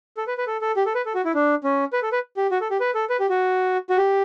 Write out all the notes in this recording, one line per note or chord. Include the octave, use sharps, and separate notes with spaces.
A4
B4
B4
A4
A4
G4
A4
B4
A4
F#4
E4
D4
C#4
B4
A4
B4
G4
F#4
A4
G4
B4
A4
B4
G4
F#4
F#4
G4